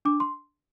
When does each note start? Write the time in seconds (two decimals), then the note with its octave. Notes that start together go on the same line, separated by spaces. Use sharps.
0.05 D4 D6
0.20 C6